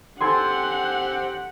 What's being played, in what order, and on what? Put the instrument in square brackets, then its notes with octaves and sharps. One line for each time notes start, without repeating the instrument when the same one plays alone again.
[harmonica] C4 G4 C5 [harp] A4 G#5 C6 [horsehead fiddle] F#5